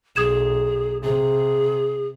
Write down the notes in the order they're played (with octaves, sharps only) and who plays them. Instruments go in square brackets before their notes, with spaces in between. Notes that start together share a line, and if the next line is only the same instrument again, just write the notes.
[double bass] B1 [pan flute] G#4 [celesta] D#6 G#6 E7
[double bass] C3 [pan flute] G#4